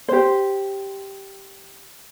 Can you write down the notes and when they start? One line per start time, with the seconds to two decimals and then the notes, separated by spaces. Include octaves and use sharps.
0.08 G4 C5